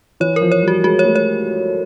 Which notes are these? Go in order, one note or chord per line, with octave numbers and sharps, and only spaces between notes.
E3 C#5
F3 A#4
C#5
G3
F#4
G#3 F#4
C#5
A3
C#5